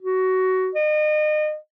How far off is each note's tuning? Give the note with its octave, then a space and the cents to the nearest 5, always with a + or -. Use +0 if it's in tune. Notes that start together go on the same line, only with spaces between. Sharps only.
F#4 +15
D#5 -35